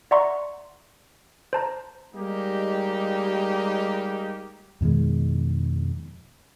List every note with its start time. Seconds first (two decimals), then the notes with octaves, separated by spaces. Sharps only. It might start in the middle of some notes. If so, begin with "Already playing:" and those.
0.11 D5 E5 F#5 A#5 C6 C#6
1.53 C5 A5 A#5
2.15 G3 G#3 A#3 D#4 G4
4.81 F2 B2 D#3 G#3